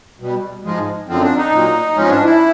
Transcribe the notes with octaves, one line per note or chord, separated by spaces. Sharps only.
B2 G3
G#2 F3 G#3
F#2 D3 F3 C4
D4
D#4
A#2 F#3
G#2 F3 G#3 C#4
D4
E4